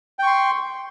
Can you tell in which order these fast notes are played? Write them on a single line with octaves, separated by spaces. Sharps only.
G5 C#6 C6